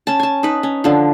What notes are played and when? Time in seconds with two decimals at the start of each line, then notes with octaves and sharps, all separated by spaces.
0.07 C#4 A5
0.20 G#5 A5
0.43 D#4 B4
0.63 C#4
0.84 D3 F3